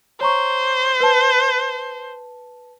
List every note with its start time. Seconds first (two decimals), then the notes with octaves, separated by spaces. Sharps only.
0.21 C5 C#5 A#5 C#6
1.01 B4 A5